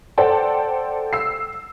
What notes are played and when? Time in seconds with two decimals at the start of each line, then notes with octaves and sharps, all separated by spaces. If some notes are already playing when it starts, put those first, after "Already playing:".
0.18 A4 C5 D5 F#5 G5 A5
1.13 E6 C7